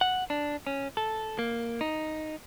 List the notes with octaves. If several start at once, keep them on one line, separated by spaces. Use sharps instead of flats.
F#5
D4
C#4
A4
A#3
D#4